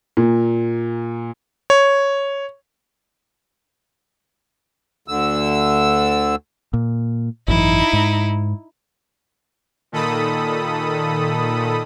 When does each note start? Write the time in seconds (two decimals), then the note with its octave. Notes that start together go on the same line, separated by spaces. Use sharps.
0.17 A#2
1.70 C#5
5.08 D2 D3 E6
6.73 A#2
7.48 G#1 F#2 E3 D#4 E4
7.93 G#2
9.92 A#2 D#3 A4 B5 D#6